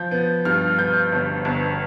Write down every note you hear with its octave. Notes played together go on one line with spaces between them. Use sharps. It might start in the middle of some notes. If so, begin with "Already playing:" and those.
Already playing: F3 G6
B3
G2 F6
B3 G6
G1
G1